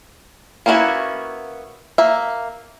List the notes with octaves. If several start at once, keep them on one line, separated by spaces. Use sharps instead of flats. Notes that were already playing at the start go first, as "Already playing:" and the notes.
A#3 B3 C#4 E4 F#4
A#3 E5